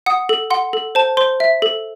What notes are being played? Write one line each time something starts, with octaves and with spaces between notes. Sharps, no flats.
F#5 D#6
A4
F#5 C6
A4
C5 A5
C5 C6
E5
A4